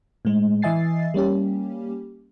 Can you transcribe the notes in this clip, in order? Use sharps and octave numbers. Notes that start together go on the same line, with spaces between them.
A2 G#3
E3 D#5 E5 G#5 A6 C7
G3 A#3 C#4 G4